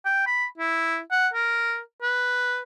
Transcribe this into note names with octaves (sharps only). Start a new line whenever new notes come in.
G5
B5
E4
F#5
A#4
B4